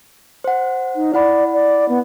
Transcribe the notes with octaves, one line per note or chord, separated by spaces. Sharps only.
C5 F#5
D#4
E4 D5 F#5 B5
D5
B3